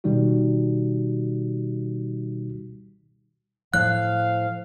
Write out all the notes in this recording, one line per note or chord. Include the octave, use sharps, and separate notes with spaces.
B2 D#3 G3 D#4 F#4
A2 F3 F5 F#6